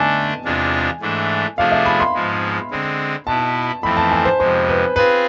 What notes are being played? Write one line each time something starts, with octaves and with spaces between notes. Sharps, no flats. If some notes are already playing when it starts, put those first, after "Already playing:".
Already playing: D3 A3 D4 G#5 A5
E2 C3 G#3 D4 F4
G#2 E3 A3 D4
C3 F3 A3 D4 G#4 F5
E5
B5
C6
G#2 F3 G#3
D3 G#3 C4
B2 B3 E4 A5
F2 E3 A3 C4 B5
A5
G#5
C5
F2 C3 G#3 C5
B4
C4 F4 G#4 B4